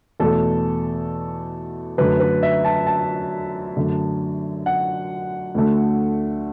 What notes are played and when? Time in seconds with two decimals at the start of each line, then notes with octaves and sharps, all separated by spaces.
0.20 E2 B2 A3 A4
1.98 F#2 D3 A3 B4
2.20 B4
2.43 E5
2.65 A5
2.87 A5
3.77 F#2 D3 A3
4.66 F#5
5.55 D2 D3 A3